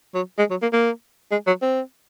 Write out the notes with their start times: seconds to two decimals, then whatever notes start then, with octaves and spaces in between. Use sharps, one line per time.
0.15 F#3
0.39 G#3
0.51 F#3
0.62 A#3
0.73 A#3
1.32 G#3
1.47 F#3
1.62 C4